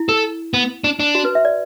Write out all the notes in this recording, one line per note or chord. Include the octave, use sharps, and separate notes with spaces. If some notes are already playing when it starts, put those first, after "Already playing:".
Already playing: E4
A4
B3
D4
D4
F#4
B4
E5
D5